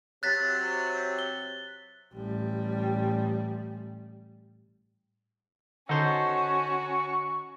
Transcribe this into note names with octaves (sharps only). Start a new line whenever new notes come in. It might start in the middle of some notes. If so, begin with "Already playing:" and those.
C3 F#3 F#6 A6 B6
G7
A1 G3
D3 C#4 D#4 F#4 A4 C5 C#6